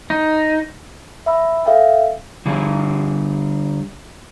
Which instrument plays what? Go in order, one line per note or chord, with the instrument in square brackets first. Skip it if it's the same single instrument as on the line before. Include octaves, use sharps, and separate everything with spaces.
[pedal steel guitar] D#4
[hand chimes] E5 B5 E6
A4 E5 F5 G5 A5
[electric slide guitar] D3 G3 G#4